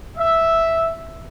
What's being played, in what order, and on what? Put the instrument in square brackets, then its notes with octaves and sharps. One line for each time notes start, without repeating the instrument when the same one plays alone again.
[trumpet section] E5